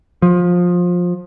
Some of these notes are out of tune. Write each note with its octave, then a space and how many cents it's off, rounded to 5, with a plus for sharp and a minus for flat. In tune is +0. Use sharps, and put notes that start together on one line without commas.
F3 +20